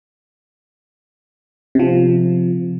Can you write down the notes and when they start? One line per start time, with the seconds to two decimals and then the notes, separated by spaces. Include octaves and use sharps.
1.75 C3 F3